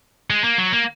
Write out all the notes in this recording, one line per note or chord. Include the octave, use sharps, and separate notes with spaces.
G#3
A#3
F#3
A#3